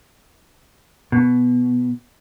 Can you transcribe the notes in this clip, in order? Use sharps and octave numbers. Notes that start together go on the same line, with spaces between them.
B2